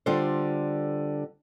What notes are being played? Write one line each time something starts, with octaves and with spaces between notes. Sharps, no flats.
D3 G3 F4 A4 C5